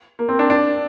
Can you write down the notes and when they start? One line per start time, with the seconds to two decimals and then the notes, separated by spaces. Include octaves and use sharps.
0.19 A#3
0.29 C4
0.39 D4
0.50 D4